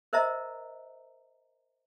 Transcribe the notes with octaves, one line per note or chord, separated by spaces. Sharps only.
A#4 C5 D#5 E5 A#5